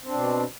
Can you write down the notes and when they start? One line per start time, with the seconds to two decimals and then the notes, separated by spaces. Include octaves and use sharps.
0.03 C4
0.08 D4
0.13 B2